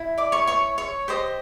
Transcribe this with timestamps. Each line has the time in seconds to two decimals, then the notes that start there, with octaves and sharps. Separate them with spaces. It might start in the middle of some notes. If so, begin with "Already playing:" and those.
Already playing: E4
0.18 D5 D6
0.32 C#5 C#6
0.47 C#5 C#6
0.78 C#5 C#6
1.08 G4 C5 D#5